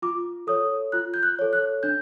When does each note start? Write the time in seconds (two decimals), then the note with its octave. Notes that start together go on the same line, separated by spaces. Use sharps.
0.02 F4 D6
0.47 A4 C#5 D#6
0.92 F4 F#6
1.14 G6
1.23 F#6
1.39 A4 C#5
1.53 F#6
1.83 D4 G6